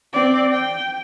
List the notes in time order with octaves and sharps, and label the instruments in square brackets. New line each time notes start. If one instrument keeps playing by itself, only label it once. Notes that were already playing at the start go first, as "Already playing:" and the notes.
[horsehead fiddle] C4 D5
G5